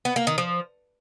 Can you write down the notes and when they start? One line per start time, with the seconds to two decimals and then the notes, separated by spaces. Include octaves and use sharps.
0.05 B3
0.16 A#3
0.27 D#3
0.38 F3